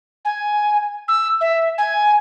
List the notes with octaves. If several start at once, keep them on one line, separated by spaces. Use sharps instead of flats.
G#5
E6
E5
G#5